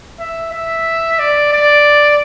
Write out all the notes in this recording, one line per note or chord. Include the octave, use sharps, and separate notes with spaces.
E5
E5
D5
D5